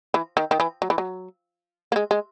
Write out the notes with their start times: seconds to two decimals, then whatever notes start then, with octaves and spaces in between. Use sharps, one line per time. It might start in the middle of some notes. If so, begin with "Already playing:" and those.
0.14 E3
0.37 D#3
0.51 D#3
0.60 E3
0.82 F#3
0.90 E3
0.98 F#3
1.92 A#3
1.96 G#3
2.11 G#3